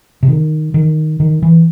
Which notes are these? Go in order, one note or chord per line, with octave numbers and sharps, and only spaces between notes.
C3
D#3
D#3
D#3
E3